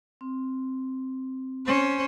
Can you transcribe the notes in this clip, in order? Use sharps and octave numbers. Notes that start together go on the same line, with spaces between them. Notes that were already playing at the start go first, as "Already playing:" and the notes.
C4
C#4 C5